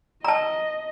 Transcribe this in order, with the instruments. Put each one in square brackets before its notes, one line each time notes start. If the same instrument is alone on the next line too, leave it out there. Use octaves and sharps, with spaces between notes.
[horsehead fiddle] D#5 [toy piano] A5 A#5